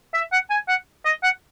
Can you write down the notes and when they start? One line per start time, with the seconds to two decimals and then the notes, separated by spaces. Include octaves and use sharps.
0.14 E5
0.32 F#5
0.51 G#5
0.68 F#5
1.05 D#5
1.23 F#5